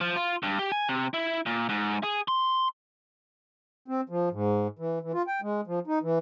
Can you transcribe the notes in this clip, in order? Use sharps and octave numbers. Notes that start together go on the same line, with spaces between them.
F3
F4
G2
G4
G#5
C3
E4
A#2
G#2
G#4
C6
C4
F3
G#2
E3
E3
F4
G5
G#3
F3
D#4
E3